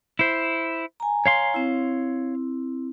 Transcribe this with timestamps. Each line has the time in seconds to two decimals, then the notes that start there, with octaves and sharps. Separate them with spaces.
0.19 E4 C5
1.00 G#5 A#5
1.26 C#5 F5 C6
1.54 C4 E4